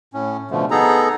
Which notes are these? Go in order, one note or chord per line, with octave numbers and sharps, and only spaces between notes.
A2 C#4
B2 D3 F3 A3
B3 D#4 G#4 A4 A#5